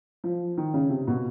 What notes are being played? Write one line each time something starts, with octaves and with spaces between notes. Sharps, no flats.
F3
D#3
C#3
C3
B2